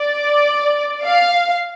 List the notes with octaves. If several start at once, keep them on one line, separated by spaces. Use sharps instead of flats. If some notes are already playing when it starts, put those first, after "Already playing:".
Already playing: D5
F5